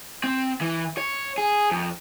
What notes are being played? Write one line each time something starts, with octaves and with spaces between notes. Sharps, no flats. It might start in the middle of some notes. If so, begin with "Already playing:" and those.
C4
E3
C#5
G#4
F2